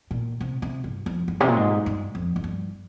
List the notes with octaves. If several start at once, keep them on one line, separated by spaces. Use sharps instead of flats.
A#2
C3
C3
G2
F2
G2
C3
A#2
G#2
G2
F2
F2
G2